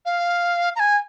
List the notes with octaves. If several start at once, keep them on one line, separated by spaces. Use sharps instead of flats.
F5
A#5
G#5